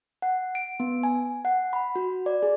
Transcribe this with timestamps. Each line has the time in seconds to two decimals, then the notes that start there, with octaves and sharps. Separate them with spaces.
0.22 F#5
0.55 D7
0.80 B3
1.03 G#5
1.45 F#5
1.73 B5
1.96 F#4
2.26 D5
2.43 G#4